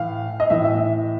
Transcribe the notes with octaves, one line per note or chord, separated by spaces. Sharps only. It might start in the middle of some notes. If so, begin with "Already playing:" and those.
Already playing: A2 E3 F5
D#5
A2 E3 E5
E5